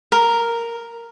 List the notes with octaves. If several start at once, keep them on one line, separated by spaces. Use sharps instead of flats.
A#4